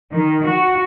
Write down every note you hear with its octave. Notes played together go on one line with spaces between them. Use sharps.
D#3
F#4